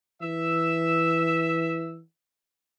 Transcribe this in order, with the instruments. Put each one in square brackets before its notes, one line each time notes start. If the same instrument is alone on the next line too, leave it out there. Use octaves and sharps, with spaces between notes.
[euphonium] E3 [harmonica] E5 E6